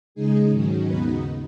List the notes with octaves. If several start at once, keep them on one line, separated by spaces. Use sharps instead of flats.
C#3 G#3 D#4 G#4
G#2 D#3 F#3 C#4
D#2 C#3 B3 D#4 F#4 B4